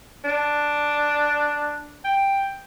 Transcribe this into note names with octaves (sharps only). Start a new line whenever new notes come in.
D4
G5